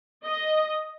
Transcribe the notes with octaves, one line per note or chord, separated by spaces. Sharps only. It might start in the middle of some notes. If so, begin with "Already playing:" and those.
D#5